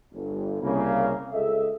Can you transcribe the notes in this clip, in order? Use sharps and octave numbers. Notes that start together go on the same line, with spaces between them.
G1
C2 C#3 A#3
C#2 G#4 A4 D#5 E5